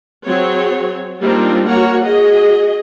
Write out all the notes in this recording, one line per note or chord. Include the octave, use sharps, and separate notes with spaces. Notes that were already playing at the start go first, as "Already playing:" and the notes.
F#3 C4 G#4 C#5
G3 A#3 C4 D4 D#4 F4
A#3 F#4 A#4 C#5 F#5
F#4 G#4 D#5